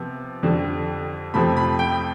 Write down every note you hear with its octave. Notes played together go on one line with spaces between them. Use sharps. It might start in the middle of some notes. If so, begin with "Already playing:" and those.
Already playing: C3 F3 B3
F2 D3 G3
F2 C3 F3 A3 B5
B5
G5